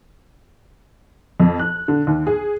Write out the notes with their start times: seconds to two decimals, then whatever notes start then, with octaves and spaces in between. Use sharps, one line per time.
1.40 F2
1.59 F#6
1.88 D3
2.07 D#2
2.27 G#4